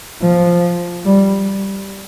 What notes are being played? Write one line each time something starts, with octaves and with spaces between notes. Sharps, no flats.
F3
G3